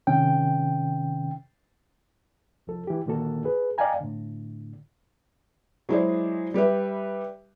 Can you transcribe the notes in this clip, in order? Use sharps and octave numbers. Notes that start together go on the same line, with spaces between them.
C3 D#3 C#4 G5
C2 F3 A4
E3 G4
A#2 D3 D#3 A#3 F#4 A4
G#4 B4
D5 D#5 F5 G5 G#5 A#5
A2 D3
F#3 G#3 E4 G#4 C5 D5
G3 G4 B4 E5